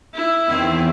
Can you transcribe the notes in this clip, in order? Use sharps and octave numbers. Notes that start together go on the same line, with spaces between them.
E4
E2 D#3 C4